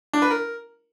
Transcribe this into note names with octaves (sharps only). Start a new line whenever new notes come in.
D4
B4
A#4